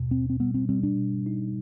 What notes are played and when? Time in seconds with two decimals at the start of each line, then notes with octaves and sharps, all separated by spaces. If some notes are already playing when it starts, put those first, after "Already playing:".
Already playing: D#2 B2
0.11 B2 C4
0.30 C4
0.40 G3 B3
0.54 C4
0.69 G3 C4
0.83 D4
0.98 B2
1.26 D#4